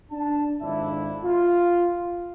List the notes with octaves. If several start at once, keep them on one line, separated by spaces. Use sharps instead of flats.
D4 A5
G#1 F2 D4 E4 E5
F4